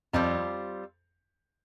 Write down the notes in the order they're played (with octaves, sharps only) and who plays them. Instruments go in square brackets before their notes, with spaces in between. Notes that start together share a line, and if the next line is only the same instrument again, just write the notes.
[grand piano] F2 [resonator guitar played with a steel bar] G3 C4 F4